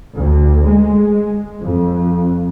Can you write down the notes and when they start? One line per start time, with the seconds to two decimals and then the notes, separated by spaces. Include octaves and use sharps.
0.16 D2
0.65 G#3
1.61 F2